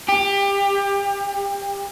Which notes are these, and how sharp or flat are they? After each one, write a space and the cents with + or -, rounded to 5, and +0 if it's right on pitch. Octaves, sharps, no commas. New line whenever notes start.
G4 +25